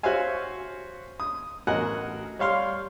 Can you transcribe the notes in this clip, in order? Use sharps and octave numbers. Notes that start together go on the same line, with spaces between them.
F#4 C5 C#5 E5 F5 G#5
D#6
A1 F#4 A#4 D#5 F#5 G#5
G3 C#5 F5 C6 F6